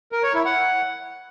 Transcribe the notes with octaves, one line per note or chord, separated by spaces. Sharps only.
A#4
C#5
E4
F#5